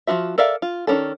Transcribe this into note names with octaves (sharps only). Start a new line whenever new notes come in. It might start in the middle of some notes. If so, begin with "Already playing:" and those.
F3 C4 F4 F#4 E5
A4 A#4 D5 E5 F5
F4
D#3 F3 C#4 D4 A4